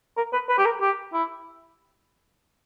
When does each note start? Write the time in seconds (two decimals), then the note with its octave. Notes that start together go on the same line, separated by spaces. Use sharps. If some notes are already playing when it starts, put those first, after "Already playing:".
0.17 A#4
0.33 B4
0.49 B4
0.58 G4
0.65 A#4
0.81 G4
1.13 E4